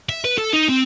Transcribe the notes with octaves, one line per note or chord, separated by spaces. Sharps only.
E5
B4
A4
D#4
C4